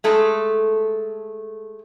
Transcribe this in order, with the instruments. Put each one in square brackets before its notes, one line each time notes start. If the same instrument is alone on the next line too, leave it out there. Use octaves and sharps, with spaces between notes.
[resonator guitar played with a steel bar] G#3 A3 A4